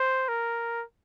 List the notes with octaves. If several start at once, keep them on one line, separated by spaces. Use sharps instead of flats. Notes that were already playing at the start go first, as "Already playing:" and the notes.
Already playing: C5
A#4